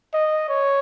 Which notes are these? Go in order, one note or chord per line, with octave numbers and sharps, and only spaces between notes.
D#5
C#5